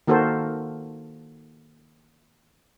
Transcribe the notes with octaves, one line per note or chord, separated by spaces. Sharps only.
D#3 A#3 F#4 A4 A#4 C5